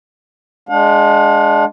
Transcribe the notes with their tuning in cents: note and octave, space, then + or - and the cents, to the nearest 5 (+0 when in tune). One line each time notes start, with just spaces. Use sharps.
G#3 +10 D4 +0 F5 +45